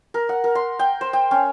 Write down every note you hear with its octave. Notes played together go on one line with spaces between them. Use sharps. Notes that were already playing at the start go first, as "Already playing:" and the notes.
A#4
F#5
A#4
C6
G5
C5
G5
C#4